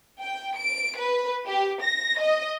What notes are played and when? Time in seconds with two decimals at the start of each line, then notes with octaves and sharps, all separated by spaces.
0.20 G5
0.56 D7
0.97 B4
1.46 G4
1.82 A#6
2.20 D#5